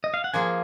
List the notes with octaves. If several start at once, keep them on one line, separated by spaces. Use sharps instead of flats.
D#5
F5
F#5
F3 A#3 F4 G#4 G#5